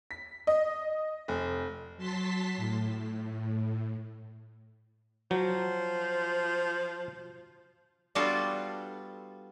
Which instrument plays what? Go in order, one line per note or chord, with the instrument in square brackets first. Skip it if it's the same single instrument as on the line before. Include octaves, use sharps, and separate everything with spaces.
[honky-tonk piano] B6
D#5
F1
[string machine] F#3 A5 C6 B6
A2
[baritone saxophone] F3 [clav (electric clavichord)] F#3
[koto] G3 B3 D4 F4 F#4 A4